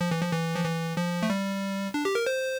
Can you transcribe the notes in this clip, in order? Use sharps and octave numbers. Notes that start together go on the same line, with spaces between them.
F3
E3
F3
E3
F3
E3
F3
A3
G3
D4
G4
A#4
C5